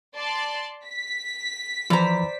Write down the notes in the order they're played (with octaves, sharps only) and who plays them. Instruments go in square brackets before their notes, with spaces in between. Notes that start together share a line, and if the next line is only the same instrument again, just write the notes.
[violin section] D5 A5 C6
B6
[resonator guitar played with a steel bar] E3 A#5 [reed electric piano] F3 [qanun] C5 D5